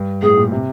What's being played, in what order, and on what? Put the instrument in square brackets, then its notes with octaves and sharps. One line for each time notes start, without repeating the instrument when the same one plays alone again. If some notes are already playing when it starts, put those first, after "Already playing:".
Already playing: [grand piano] G2
[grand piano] A2 [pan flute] G#4
[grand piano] A#2
C3